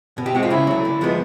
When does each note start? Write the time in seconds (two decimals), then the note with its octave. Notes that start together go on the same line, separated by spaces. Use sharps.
0.18 B2
0.26 G4
0.35 G#3 C4 F#4
0.43 F4
0.50 C#3 E4
0.67 F#3 A3
0.85 D3
1.01 F3 G#3 B3